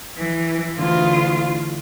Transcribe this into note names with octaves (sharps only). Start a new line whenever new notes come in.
E3
D2 D3 E3 F4